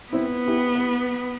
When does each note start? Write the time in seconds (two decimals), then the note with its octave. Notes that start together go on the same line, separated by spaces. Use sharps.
0.13 B3 C4 E4
0.47 E4 G4
0.75 B4